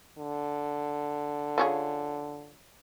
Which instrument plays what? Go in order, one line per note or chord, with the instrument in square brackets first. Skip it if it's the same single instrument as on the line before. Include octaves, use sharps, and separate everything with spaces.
[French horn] D3
[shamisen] F3 C#4 G#4